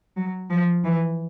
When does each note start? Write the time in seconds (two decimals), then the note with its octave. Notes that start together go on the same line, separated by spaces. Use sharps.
0.17 F#3
0.50 F3
0.84 E3